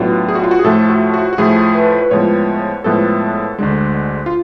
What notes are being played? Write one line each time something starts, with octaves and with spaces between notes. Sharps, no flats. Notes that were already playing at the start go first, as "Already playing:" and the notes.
Already playing: A2 F#3 B3 D4 F4 F#4
G#4
F#4
F4
F#4
G#4
A2 F3 A3 F4 A4
F#4
F#4
F#4
A2 F3 A3 F4 G#4
B4
B4
A2 F3 G#3 B3 C#5
A2 F3 G#3 B3 A4
D2 D3 G#3
F4